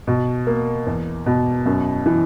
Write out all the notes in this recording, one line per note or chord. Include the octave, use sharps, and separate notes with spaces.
B2
A#3
E2
B2
F#2
E3